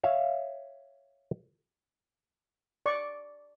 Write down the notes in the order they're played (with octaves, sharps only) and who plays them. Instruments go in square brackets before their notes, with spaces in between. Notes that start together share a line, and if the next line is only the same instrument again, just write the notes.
[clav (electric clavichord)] C#5 E5 F5
[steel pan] D5 C#6